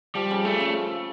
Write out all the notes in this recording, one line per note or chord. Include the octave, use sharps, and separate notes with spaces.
F3 G3
C#3
C#3 A3
C#3